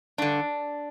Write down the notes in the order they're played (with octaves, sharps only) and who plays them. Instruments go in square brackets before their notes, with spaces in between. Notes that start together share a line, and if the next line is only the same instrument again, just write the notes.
[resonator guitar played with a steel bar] G2 D3 D4